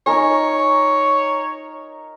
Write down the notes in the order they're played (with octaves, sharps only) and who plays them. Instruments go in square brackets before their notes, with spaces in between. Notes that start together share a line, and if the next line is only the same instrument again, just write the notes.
[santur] D#4 A#4 G#5 [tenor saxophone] C#5